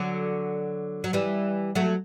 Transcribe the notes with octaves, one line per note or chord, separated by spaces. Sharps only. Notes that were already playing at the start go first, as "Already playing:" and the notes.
Already playing: D3 F#3
F#3
E3 G3
F#3 A3